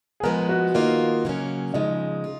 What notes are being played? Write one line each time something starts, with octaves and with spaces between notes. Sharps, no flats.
G#4
F3 G#3 B3 A#4
F#4
D#3 A#3 D#4 F4
C#3 F#3 A#3 C#4
C#3 F3 G#3 D#4
F4